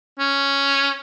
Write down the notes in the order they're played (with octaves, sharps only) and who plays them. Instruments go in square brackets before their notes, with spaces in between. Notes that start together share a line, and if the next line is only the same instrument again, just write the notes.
[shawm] C#4